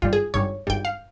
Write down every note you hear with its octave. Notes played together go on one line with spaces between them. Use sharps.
G#1 G2 G3 F4
G#4
G#1 G2 G3 C#5
G#1 G2 G3 G5
F5